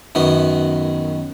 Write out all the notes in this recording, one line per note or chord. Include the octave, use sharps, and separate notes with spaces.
F#2 D#3 B3